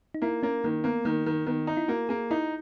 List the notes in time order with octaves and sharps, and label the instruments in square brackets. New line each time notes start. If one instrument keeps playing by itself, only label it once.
[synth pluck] D#4
[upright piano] A#3 [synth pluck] E4
[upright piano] A#3 [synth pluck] C#4
[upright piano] D#3 [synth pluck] A#3
[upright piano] A#3 [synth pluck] B3
[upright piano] D#3 [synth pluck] A#3
[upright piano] D#3
[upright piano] D#3 [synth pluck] B3
[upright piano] D#4
[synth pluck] E4
[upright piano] A#3 [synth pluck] F#4
[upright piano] A#3 [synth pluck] G#4
[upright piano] D#4 [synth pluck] E4